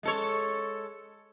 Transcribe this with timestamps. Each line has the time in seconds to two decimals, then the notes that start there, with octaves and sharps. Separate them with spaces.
0.03 G#3 A4 C#5